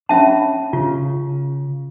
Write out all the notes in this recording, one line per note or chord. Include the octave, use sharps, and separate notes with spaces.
C#4 D4 C#5 E5 A5 B5
C#3 F4